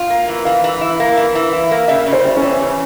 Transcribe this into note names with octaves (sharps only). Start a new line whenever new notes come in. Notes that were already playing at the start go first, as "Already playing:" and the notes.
Already playing: F4
A#3
E3
E3 F5
E3
E4
A#3
E3
E3
E4
A#3
C#3 E5
C#3
C5
G3
C#4
E3
C#3